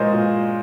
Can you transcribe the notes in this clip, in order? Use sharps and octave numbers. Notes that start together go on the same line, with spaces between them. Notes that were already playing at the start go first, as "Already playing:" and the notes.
Already playing: A#2 F3 G#3 A#4 C5 C#5 D#5
A#2